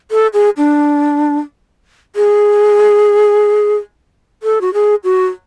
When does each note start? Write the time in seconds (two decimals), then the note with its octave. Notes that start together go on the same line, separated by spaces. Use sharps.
0.11 A4
0.34 G#4
0.57 D4
2.16 G#4
4.43 A4
4.61 F#4
4.74 G#4
5.04 F#4